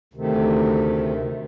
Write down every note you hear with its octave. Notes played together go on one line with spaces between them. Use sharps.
D2 C3 D#3 A3